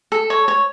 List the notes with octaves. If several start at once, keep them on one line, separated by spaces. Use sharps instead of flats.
A4
C#5
C#5